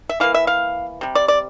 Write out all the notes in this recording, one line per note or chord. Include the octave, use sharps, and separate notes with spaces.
E5
E3 A#3 F5
E5
F5
C3 G3
D5
D5